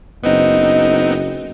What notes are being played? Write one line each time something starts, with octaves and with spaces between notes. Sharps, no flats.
F#1 B3 C4 D#4 D#5